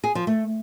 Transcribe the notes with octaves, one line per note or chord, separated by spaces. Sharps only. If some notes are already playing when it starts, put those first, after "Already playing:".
G#4
F3
A3